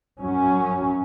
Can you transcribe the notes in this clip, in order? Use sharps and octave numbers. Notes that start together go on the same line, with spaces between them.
F#2 F#3 C#4